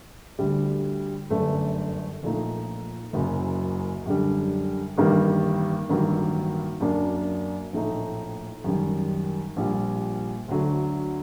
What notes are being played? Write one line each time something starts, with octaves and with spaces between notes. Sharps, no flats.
D2 D3 G3
G1 F#2 D3 A3 D4
A#1 A#2 A3 D#4
F#1 F#2 F#3
F#2 D3 G3
A1 G2 D#3 G3 A#3
A1 G2 D#3 F#3 A#3
F#2 F#3 A#3 D4
A#1 A2 A3 D#4
F#2 D#3 G3
A#1 A#2 G3
D2 D3 F#3 A3